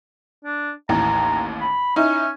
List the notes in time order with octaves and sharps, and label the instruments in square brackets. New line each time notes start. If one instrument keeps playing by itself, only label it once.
[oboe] D4
[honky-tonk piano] A1 D#2 E3 [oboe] A#5
[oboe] B5
[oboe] C#4 [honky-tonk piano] D#4 E4